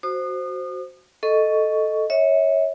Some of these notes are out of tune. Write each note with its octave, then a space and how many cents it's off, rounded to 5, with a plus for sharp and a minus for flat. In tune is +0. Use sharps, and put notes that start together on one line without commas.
F#4 +0 C5 +0 D#6 -35
A4 -5 D#5 +0 C#6 +10
C#5 -5 E5 -35